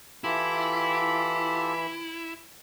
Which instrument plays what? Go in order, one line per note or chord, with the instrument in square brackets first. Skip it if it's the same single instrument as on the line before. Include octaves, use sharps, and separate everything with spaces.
[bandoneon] E3 B5 [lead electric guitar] E4 [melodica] F4 G4 A4